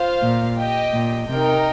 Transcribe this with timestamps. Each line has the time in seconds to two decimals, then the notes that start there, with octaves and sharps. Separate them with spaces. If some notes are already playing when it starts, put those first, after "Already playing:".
Already playing: F4 C5 F5
0.22 A#2
0.57 G4 D#5 G5
0.93 A#2
1.28 C3 D#4 A#4 G5